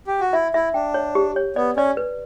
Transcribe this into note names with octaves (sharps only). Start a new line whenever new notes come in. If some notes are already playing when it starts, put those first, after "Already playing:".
G4
F#4
E4 E5
E4 E5
D4 G5
C#5
G4
C#5
B3 D5
C#4 D5
B4